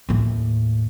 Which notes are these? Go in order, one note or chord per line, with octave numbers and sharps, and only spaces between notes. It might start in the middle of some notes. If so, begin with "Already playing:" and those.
D#2 A2